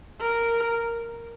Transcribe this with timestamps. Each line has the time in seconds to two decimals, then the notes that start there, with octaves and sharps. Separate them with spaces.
0.21 A#4